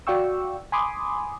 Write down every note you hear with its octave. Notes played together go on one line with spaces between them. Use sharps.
F#4 D5 F5 G5 C#6 E6
G#5 B5 C6 D6 D#6